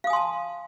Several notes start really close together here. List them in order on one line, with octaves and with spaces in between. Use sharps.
F5 D#6 G#5 C6 A5